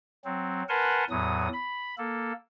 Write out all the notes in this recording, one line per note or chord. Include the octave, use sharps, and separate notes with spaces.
F#3 C4
A#4 B4 F#5 G#5 A5 C6
E2 A2 F#3 D#6
B5
A#3 A4